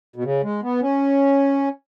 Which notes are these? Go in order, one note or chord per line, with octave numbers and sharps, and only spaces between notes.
B2
C#3
G#3
B3
C#4